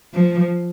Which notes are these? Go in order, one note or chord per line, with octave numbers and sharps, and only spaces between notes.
F3